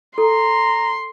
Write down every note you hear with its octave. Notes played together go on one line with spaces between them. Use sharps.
A4 A#5 C6